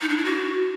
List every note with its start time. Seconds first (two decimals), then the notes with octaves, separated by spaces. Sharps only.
0.01 D#4
0.09 D4
0.17 E4
0.25 F#4